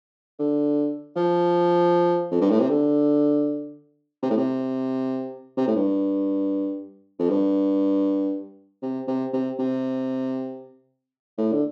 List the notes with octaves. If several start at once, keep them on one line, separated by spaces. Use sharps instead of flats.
D3
F3
F2
G2
A2
C3
D3
C3
A2
C3
C3
A2
G2
F2
G2
C3
C3
C3
C3
A2
D3